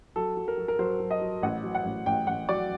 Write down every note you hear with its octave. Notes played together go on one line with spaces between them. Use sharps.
F#3 A4
F#3
A#4
F#3
A#4
F#3 C5
F#3
D#5
F#3
A1 F#5
F#3
F#5
A1
A1 G5
A1 F#5
F#3 D5